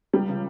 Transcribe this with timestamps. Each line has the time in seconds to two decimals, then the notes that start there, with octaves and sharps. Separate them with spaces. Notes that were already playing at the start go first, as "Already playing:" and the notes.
0.13 C#2 G3
0.29 C#3